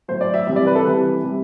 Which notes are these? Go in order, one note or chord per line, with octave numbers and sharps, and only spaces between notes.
A2 F#3 C5
D5
E5
C3 E3 G3 E5
D5
B4
A4
C3 E3 G3 B4
C3 G3